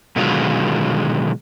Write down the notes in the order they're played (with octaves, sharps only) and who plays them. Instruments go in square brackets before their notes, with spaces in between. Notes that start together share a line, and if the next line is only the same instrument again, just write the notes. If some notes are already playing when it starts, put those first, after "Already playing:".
[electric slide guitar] B2 D3 D#3 F#3 G#3 F4